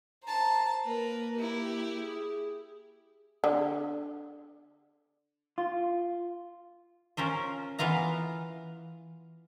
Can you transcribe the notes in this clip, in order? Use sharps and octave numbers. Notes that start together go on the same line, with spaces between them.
C5 A5 A#5
A#3 A#4 B4
E4 G4
G#4
D3
F4
C#4 F4 A#4 C5
E3 B3 F4 F5 A#5